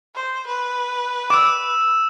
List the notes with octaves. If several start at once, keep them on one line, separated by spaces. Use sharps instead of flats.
C5
B4
D6 E6 E7